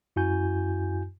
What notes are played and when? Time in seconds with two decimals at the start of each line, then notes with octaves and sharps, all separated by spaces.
0.16 F#2 E4 F#4 G#5 G6